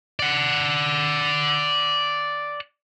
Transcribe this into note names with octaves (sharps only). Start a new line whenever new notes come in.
D5 F#5